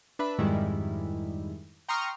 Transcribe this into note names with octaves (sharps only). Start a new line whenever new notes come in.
D4 B4 E5 B5
F2 G#2 D#3 G3 G#3 E4
G5 A#5 C6 C#6 D#6 F6